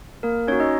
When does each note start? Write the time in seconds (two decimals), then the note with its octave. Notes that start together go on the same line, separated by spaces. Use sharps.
0.23 A#3 A#4
0.47 C#4 D#4 F#4 C#5
0.60 D#4 D#5